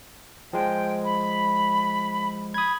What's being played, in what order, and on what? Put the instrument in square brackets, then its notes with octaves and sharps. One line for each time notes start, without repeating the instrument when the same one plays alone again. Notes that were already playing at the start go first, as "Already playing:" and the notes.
[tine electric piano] F3 G#3 [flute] G5
[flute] B5
[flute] B5 [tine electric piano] D#6 G#6